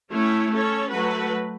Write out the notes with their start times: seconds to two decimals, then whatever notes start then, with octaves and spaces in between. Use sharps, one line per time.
0.12 A3 C#4 E4 C#5
0.51 C#4 A4 C#5
0.90 F#3 A3 F#4 B4